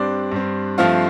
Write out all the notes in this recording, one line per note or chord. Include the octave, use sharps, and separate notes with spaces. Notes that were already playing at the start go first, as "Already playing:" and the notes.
Already playing: G2 G3 C4 D4 D5
G2 G3 C4
G2 F3 A3 C4 F4 F5